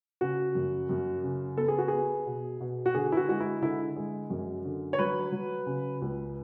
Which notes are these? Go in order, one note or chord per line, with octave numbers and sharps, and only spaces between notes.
C#3 F#4
F#2
F#2
C#3
B3 A4
G#4
F#4
B3 G#4
B2
B2
F#4
D3 G#4
E4
F#4
G#3 F#4
E4
D3 E4
G#3
F#2
D3
C#5
F#3 B4
F#3
C#3
C#2